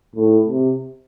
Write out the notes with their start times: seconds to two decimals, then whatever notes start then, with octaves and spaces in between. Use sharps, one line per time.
0.16 A2
0.47 C3